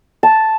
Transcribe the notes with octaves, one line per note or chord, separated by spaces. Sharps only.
A5